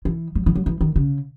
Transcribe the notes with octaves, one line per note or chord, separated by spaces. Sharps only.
E3
F#3
E3
F#3
E3
D#3
C#3